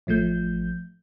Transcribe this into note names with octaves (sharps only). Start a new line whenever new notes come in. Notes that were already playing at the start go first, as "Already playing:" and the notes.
A1 F3 A3 G6